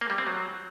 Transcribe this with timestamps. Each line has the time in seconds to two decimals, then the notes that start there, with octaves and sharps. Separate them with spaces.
0.01 A#3
0.10 G3
0.18 C4
0.27 F#3